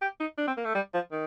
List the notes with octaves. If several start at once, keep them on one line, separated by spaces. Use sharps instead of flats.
G4
D#4
D4
C4
A#3
A3
G3
F3
D#3